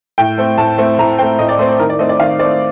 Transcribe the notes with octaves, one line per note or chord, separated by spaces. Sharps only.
A2 G5
A3 C4
A2 A5
A3 C4
A2 A#5
A3 C4 G5
A2 D#5
D5
A3 C4 C5
C5
D#3 A#4
D5
A3 C4 D#5
D5
D#3 F5
A3 C4 D5